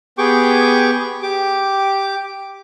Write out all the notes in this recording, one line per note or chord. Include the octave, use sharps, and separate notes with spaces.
B3 G4 G#4 G5 C#6 D6
G4 D6